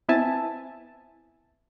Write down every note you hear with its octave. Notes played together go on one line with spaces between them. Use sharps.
B3 C4 E4 E5 G#5 A5